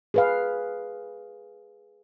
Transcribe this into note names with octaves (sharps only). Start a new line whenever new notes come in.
G#4 B4 F5